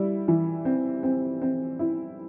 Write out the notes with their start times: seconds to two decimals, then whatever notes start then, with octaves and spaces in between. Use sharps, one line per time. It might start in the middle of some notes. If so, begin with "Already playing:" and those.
Already playing: G3 E4
0.28 E3
0.65 C4
1.03 C4
1.42 C4
1.79 E4